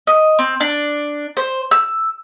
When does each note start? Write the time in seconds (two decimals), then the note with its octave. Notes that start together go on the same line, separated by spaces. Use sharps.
0.07 D#5
0.39 C4
0.60 D4
1.37 C5
1.71 E6